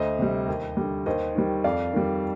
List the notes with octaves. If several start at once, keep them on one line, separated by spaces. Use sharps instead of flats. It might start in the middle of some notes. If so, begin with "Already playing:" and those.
Already playing: D2 C5 D#5
C3 G3
D#2
D3 G3
D#2 C5 D#5
D#3 G3
F2 D5 F5
D#3 G3